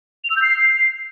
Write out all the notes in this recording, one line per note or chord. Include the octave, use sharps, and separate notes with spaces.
F7
E6
G6
C7